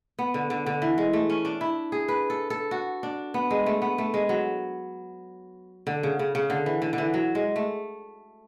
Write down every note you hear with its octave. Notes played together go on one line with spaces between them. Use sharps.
B3
D3
D3
D3
E3
G#3
A3
C#4
D4
E4
G#4
B4
A4
A4
F#4
D4
B3
G#3
A3
B3
A3
G#3
F#3
D3
C#3
C#3
C#3
D3
E3
D3
D3
E3
F#3
G#3
A3